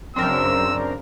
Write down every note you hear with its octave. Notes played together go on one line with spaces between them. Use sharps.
F#2 C#3 C4 D4 A#4 E6